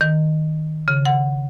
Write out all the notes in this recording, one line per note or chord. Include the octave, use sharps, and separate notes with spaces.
D#3
C#3
F#5